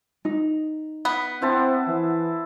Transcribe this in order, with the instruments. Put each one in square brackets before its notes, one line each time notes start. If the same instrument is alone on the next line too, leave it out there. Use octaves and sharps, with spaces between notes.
[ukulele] D#4
[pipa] B3
[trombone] C4 [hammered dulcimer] E4 C5 A5
[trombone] E3